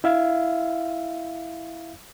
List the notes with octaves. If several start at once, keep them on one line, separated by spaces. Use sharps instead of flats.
E4 E5 F5